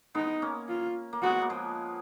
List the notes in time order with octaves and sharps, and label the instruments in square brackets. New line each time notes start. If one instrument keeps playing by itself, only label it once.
[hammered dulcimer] G#3 B3 [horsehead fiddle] D#4
[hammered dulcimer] A#3 C#4
[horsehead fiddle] F4
[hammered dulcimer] A#3
[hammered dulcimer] G#3 B3 [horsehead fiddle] F#4
[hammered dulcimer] A#3
F3 G#3